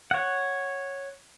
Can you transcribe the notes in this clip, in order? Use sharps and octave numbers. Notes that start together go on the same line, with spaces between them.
C#5 F#5